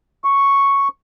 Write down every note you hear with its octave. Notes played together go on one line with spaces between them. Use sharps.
C#6